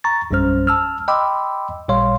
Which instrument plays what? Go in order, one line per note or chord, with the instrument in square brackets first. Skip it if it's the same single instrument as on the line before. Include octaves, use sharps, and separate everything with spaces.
[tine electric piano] A#5 C#6 A6
A#1 F#2 G3 C#4 C5 F6
A5 E6 F6
D#5 G5 B5 C6 D6 E6
A1 A#2 G3 C#5 F5 C6